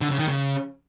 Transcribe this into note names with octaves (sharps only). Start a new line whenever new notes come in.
D3
C#3
D#3
C#3